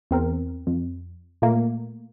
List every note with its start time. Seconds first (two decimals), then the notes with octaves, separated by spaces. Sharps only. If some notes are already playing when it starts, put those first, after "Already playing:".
0.11 E2 C4 A#4
0.67 F2
1.42 A#2 A3 A#3